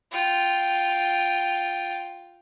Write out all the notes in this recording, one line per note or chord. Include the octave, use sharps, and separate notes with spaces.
F4 G5